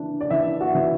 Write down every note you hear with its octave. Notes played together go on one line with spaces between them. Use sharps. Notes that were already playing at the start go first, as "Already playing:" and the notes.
Already playing: E3 D4
D5
E3 E5
F#4
E3